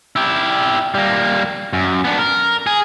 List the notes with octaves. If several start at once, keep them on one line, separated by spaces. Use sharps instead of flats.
E4 G4
G3 A#3
F#2
B3 D4
A#4
G#4